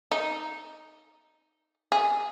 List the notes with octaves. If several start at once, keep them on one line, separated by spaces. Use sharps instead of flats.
D#4
G#4